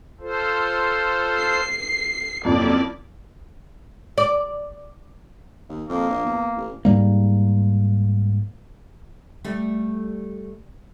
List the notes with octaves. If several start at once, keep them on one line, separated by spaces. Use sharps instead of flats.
F4 A4 C5
C7
F2 C3 F3 F#3 A#3 C#4 E4 D5
D5
D#2
F2 A#3
A#1
E2
A1
G#2 G3 A#3
G3 A3